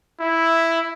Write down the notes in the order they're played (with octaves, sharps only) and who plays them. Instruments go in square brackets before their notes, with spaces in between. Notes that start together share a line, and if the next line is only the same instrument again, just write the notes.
[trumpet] E4